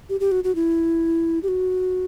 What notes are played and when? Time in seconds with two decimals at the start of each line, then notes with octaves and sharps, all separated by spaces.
0.09 G4
0.20 G4
0.32 F#4
0.44 F#4
0.55 E4
1.43 G4
1.48 F#4